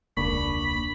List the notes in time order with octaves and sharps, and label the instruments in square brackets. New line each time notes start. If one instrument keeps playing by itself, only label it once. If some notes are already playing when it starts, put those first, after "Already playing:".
[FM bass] E1 [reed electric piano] C#2 A#3 C#6 [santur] D4 B4 [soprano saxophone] B5